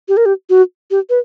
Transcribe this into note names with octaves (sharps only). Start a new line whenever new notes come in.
G4
A#4
G4
F#4
G4
B4